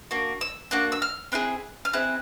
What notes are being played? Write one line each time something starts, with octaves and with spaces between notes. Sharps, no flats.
A#3 D4 F#4
E6
A#3 D4 F#4 F#6
E6
F6
C4 E4 G#4 F#6
F6
C4 E4 G#4 F#6